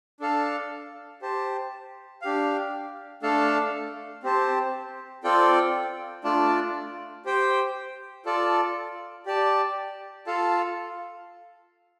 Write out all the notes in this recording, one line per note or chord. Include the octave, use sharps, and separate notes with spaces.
D4 A4 F5 A5
G4 C5 A5
D4 G4 F5
A3 D4 A4 F5 A5
C4 G4 C5 A5
C4 F4 A4 D5 G5
A3 D4 F4 D5 A5
G4 C5 G5
F4 A4 D5 A5
G4 D5 A5
F4 A4 F5 A5